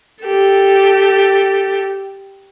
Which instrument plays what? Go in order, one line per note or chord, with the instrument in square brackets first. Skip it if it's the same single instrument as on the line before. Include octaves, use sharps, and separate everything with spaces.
[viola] G4 A4